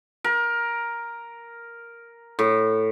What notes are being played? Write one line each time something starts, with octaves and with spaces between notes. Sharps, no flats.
A#4
A2